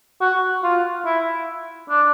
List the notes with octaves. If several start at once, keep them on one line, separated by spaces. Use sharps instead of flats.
F#4
F4
E4
D4